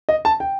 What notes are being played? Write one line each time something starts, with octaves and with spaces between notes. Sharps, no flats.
D#5
A5
G5